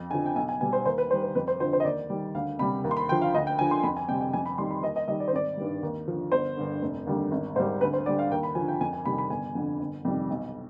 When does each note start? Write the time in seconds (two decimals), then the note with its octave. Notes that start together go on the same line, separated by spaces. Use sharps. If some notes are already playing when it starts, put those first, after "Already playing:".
Already playing: F2
0.11 D3 G#5
0.14 F3
0.26 G5
0.36 B1 G#5
0.49 G#5
0.61 B2 G3 G#5
0.73 C5
0.86 D#2 C5
0.98 B4
1.10 D#3 C5
1.14 G3
1.23 B4
1.35 F2 B4
1.48 C5
1.60 D3 F3 C5
1.73 C5
1.80 D#5
1.85 D#2 D5
2.10 D#3 G3
2.35 D2 F5
2.59 C3 B5
2.62 G3
2.84 D#2
2.91 C6
2.97 B5
3.09 D3 F3 G5
3.22 F5
3.34 D2 D#5
3.47 G5
3.59 D3 F3 G#5
3.71 C6
3.83 F2 B5
3.97 G#5
4.09 C3 G3 G5
4.21 G5
4.33 F2 G#5
4.46 B5
4.58 D#3 G3 C6
4.71 B5
4.83 D#2 D#5
4.96 D#5
5.08 D#3 G3 D#5
5.20 D5
5.28 C5
5.33 G#1 D5
5.57 G2 D#3 G3
5.83 D#2
6.08 D3 F3
6.32 G1 C5
6.57 G2 D3
6.82 F1
7.07 D#2 D3 G3
7.32 G#1
7.56 G#2 G3 C5
7.81 D2 B4
7.93 C5
8.06 D3 D5
8.09 G3
8.19 F5
8.31 D#2 G5
8.43 B5
8.55 D3 F3 G#5
8.68 G5
8.81 F2 G#5
8.93 G#5
9.05 C3 D#3 G3 B5
9.18 B5
9.30 G1 G#5
9.55 F2 D3
9.80 G1
10.05 F2 C3 D#3 G3
10.30 B1